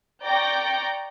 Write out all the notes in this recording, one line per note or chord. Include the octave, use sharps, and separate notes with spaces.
D5 G5 A#5 C#6 G6 A#6